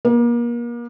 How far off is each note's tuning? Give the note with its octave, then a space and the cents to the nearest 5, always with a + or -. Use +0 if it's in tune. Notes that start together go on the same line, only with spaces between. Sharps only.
A#3 +35